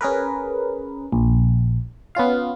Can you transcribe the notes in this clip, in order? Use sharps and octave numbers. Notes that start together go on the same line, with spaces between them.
C#4 G#4 A#4 B4
A#1
B3 C#4 F4 F5